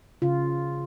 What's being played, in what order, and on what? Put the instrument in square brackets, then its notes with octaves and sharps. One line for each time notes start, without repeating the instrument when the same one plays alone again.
[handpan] C#3 F4